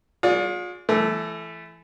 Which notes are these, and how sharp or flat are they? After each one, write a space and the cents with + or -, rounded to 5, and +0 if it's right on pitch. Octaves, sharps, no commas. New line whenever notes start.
F4 +40 G#4 +0 D5 -25
E3 +25 A3 -10